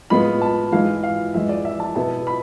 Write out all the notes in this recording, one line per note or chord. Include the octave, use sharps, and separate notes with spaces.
A2 G#3 B3 F4 B5
A5
G#2 E3 G#3 F5
F5
F2 E3 G#3 E5
D5
E5
A5
B2 B3 E4 A5
B5